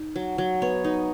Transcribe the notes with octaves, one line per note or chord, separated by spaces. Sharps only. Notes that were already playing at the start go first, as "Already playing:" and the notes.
Already playing: D#4
F#3
F#3
B3 C#5
D#4